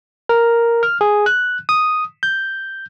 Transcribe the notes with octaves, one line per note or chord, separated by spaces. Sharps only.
A#4
F6
G#4
F#6
D#6
G6